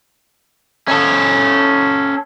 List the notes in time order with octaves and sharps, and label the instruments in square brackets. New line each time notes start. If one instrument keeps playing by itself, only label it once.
[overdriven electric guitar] C#4 A4